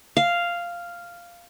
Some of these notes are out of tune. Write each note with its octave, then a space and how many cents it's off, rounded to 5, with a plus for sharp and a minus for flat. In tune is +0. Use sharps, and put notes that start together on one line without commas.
F5 -5